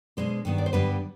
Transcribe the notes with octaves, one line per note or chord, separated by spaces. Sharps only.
B2 G#3 D4 C5
G2 D#3 B3 D4
D5
C5
G2 D3 G3 B3 D4 B4